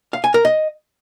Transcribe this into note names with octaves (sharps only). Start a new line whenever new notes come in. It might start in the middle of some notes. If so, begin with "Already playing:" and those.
F5
G#5
A#4
D#5